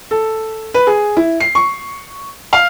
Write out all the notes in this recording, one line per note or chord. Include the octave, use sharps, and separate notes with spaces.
A4
B4
G#4
E4
C7
C#6
F5